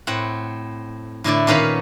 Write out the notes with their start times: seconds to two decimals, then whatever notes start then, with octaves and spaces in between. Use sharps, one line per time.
0.07 A2 C4 F#5
1.24 A2 D3 E4 D5
1.47 A#2 D#3 C#4 B4 F5 B5